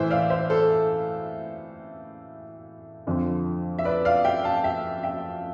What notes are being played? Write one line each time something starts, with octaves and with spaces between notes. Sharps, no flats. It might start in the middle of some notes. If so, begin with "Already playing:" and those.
Already playing: A2 E3 C5 E5
D5 F5
C5 E5
A4 C5
F2 D3 F3
E5
B4 D5
D5 F5
E5 G5
F5 A5
E5 G5
E5 G5